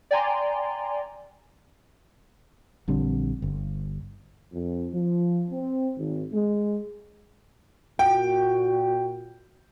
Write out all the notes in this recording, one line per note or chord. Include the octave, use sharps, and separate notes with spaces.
D5 G5 G#5 A#5 C6
A#1 D3 G3 C4
G1
F2
F3
C4
G#1
G#3
A#2 F#4 G5